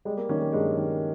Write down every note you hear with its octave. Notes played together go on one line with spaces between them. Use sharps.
G3 G#3
A#3
D#3 A#3 C#4
A#3
G2 G#3
D#3